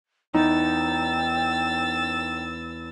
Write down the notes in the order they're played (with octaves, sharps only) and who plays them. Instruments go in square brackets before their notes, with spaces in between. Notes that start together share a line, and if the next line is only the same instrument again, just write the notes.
[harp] E2 [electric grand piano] D#4 [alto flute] G5 [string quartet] E6 A6